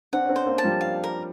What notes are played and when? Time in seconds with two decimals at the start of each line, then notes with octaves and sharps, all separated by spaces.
0.13 C4 D4 F#5
0.25 C#4
0.29 C4 D4
0.36 C5
0.46 A#3 C4
0.58 A5
0.64 F3 G3
0.81 F5
1.04 A#4